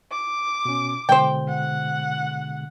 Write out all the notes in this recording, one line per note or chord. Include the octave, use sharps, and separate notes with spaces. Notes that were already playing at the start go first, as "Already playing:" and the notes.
D6
B2 C#4
B2 D3 G#3 C5 G5
F#5